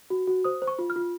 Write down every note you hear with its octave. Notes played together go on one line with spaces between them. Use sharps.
F#4
F#4
C5 D#6
C5
C#6
F4
F6
F4